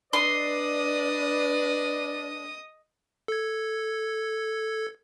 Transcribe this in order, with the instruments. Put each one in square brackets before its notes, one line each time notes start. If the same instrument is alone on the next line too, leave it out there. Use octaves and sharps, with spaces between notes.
[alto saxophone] D4 [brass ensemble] B4 D5 [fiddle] D#5 D#6 [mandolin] C6
[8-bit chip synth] A4 G#6